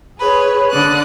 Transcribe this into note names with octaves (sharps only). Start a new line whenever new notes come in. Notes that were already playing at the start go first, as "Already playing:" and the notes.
G#4 B4 C#5
D3 D5 D#6 F#6